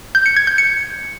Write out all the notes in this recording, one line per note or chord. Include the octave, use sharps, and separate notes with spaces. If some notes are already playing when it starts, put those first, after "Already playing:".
G6
C#7
G#6
G6
C#7